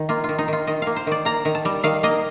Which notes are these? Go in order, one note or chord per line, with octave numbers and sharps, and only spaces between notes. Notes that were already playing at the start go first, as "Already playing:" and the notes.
Already playing: D#3
A#3 F4
D#3 F4
D#4
D#3 F4
D#3 D#5
A#3 F5
C5
D#3 D5
A#3 A#5
D#3
A5
G3
D#3 F5
A#3 D#5